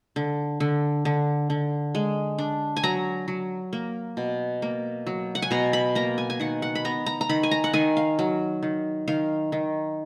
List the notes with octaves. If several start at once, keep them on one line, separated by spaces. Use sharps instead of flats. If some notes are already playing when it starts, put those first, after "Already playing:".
D3
D3
D3
D3
G#3
D4
G#5
F#3 A#5
F#3
A#3
B2
A#3
F#3
F#5
G#5
B2 A#5
B5
A#3 A#5
G#5
G#5
D#3 F#5
F#5
B5
B3 A#5
A#5
A#5
D#3 B5
G#5
A#5
F#5
D#3 G#5
F5
F#3
D#3
D#3 F5
D#3